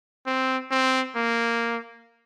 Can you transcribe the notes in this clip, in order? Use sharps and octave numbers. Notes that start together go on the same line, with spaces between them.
C4
C4
A#3